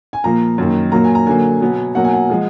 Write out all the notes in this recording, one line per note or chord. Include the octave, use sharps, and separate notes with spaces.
G#5
A#2 F3 A#3 A#5
F#2 D#3 A#3
A#2 F#3 A#3 A#5
G#5
A#5
D3 F#3 A#3 G#5
B2 F#3 B3
B2 F#3 A#3 F#5
G#5
F#5
F3 G#3